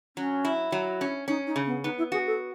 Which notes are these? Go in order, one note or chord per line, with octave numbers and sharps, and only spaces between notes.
F#3 C#4
E4
F#3
C#4
C#4 D#4
D#4
C#3
B3
B3 D#4
E4
F#4 G#4
A4